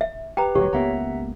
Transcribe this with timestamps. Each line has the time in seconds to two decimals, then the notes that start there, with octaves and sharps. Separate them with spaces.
0.01 E5
0.37 G4 B4 G5 A#5
0.55 D#1 D2 F#3 G4 C#5
0.73 C#2 A#3 B3 E5 F#5 A#5